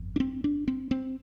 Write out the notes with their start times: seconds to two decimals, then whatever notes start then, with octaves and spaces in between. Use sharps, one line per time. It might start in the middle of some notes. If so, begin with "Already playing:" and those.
Already playing: G1 F2
0.16 D4
0.20 C4
0.44 D4
0.68 C4
0.91 C4